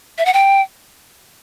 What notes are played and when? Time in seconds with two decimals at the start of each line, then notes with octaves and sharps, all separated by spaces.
0.18 E5
0.25 F#5
0.33 G5